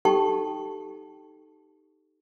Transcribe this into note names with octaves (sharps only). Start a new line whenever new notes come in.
D#4 G4 A4 G5 A5 C#6